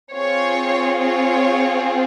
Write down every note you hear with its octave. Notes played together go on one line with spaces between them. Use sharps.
C4 F4 G#4 C#5
C#5